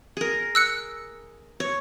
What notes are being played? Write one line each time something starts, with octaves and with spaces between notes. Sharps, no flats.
G#4 A#4
E6 F#6 C#7
C#5